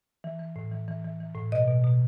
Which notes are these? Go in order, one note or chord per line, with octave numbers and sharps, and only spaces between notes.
E3
E3
A2
E3
E3
E3
E3
A2
B2 D#5
B2
B2